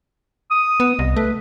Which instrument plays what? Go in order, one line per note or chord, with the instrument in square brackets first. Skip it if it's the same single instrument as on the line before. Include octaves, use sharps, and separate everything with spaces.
[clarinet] D#6
[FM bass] B3
[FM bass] C2 [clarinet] D#5
[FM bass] A3 [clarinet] B4